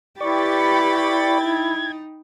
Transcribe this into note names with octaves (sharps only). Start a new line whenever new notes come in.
E4 G4 B4 D5 G5 B5 C#6 A6
D#4 G#6